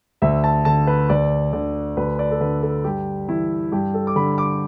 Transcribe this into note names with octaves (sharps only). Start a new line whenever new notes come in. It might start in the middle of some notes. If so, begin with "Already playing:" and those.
D2 E5
A5
D3 A5
B4
D2 D5
D3 D5
D2 B4
D5
A4
D3 B4
A4
G2 G4
E3 E4
G2 G4
A4
D6
D3 B5
B5
D6